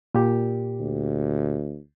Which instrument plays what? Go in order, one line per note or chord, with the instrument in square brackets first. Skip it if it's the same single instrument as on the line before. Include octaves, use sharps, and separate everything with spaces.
[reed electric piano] A#2 G4
[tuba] D2